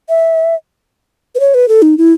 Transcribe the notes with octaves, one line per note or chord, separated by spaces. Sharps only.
E5
B4
C#5
B4
A4
D#4
E4